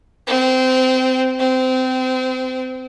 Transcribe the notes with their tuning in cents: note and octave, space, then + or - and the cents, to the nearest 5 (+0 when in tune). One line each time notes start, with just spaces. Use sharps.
C4 -20
C4 -25